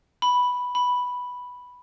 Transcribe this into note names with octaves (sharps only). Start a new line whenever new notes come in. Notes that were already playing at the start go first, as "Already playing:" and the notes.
B5
B5